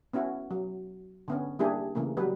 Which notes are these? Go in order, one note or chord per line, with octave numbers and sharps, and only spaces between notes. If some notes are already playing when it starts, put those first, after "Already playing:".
B3 C#4 E4 F#4
F#3
D3 B3 C#4
G3 A#3 D4 E4 G4 G#4
C#3 E3 A3 A#3
F#3 G3 B4